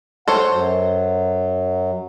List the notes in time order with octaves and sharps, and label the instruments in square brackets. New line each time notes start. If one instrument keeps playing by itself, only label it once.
[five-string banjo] A4 C5 C#5 [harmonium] F#5
[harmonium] F#2 F#3